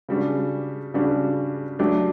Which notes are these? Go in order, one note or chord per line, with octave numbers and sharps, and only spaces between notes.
C#3 G3 D4 F#4
C#3 G3 D4 F#4
F#3 A3 D4 G4